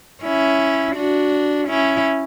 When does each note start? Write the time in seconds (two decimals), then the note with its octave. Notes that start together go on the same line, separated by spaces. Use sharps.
0.24 C#4 E4
0.96 D4 F#4
1.68 C#4 E4